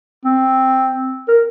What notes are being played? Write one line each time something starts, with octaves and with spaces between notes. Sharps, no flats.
C4
A#4